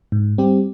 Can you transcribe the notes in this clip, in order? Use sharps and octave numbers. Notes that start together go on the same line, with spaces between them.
G#2
G3 C4 G4